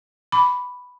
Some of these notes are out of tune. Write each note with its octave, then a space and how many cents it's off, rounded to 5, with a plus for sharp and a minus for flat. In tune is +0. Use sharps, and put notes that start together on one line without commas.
B5 +0 D6 -15